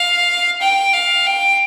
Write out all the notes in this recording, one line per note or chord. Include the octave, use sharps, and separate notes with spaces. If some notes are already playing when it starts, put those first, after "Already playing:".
Already playing: F5
G5
F5
G5